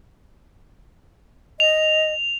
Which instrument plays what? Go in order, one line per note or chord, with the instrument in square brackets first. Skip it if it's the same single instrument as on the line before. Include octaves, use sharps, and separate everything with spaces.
[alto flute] D#5 [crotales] F7